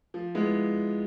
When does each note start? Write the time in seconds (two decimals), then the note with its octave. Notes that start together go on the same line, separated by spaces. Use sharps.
0.14 F3
0.35 G#3 B3 E4